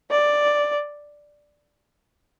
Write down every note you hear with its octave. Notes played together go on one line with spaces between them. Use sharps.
D5